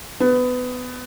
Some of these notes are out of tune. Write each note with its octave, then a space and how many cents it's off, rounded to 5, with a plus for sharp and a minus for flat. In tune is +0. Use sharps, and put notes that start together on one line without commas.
B3 +20